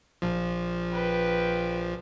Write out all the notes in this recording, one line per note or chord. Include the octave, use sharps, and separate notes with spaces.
A#1 F3
B4 G5